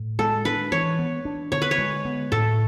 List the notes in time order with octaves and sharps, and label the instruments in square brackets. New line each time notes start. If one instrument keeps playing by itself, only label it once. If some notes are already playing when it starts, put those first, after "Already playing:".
Already playing: [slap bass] A2
[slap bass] G#3 [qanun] A4
[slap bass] D4 [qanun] B4
[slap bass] E3 [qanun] C#5
[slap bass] B3
D4
[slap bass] D3 [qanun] C#5
[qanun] B4
C#5
[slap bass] G#3
B3
[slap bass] A2 [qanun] A4